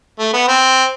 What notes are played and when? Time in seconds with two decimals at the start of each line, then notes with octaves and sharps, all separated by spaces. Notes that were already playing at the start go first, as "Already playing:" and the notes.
0.19 A3
0.33 B3
0.48 C4